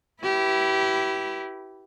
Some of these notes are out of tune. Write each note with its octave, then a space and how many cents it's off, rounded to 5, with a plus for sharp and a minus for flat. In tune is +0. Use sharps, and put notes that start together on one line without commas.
E4 +0 G4 -25 B4 -15